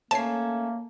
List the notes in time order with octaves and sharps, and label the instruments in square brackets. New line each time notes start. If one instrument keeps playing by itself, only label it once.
[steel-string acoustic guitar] A3 C#4 A4 [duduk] A#3 [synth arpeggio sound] A5 C7